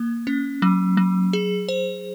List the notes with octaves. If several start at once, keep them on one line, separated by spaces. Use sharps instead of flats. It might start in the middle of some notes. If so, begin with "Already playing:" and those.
Already playing: A#3
C#4
F#3
F#3
G#4
C5